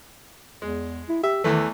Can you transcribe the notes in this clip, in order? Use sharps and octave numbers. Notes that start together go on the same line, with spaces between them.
E2 G#3
E4
G4 E5
E2 D#3 E3 A3